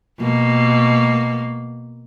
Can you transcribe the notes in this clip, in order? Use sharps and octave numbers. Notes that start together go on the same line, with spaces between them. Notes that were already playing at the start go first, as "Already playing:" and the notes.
B2 A#3